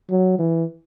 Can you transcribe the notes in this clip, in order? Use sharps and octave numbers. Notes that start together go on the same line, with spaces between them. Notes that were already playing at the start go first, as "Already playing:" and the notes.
F#3
E3